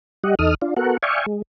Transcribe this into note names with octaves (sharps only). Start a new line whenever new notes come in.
G3 G4 D#5 F#5
E2 D#4 A4 D#6 F6
D4 F4
B3 F#4 A4 A#4 F#5
D5 E5 F5 G5 G#5 C#6
G#3